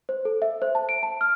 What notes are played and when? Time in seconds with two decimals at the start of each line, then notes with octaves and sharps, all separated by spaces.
0.09 C5
0.25 A4
0.42 E5
0.62 C5
0.75 A5
0.89 D7
1.03 A5
1.21 F6